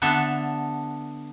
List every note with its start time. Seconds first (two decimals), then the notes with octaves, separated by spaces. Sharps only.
0.02 D3 B3 D4 A4 E5